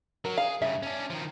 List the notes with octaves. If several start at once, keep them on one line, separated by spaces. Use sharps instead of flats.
F#3 A#4
G#4 F5
G2 C#3 E5
C#4 D4
D#3 F3